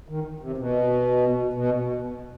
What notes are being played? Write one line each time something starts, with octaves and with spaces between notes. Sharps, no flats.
D#3
C3
B2
B2